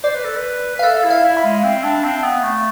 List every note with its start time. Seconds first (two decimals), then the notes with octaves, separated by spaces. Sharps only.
0.04 C5 D5
0.15 B4
0.24 A4
0.36 B4
0.75 B4
0.79 F5
0.83 A4 E5
1.04 E4
1.10 F5
1.23 E4
1.37 B5
1.44 G#3
1.64 C4
1.83 D4
2.04 C4
2.23 B3
2.43 A3